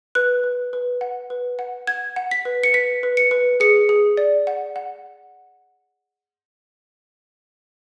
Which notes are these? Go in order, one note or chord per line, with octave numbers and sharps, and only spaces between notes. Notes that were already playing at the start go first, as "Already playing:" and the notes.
B4 F#6
B4
B4
F#5
B4
F#5
F#5 G#6
F#5
B6
B4
C#7
B4 B6
B4
C#7
B4
G#4 C#7
G#4
D5
F#5
F#5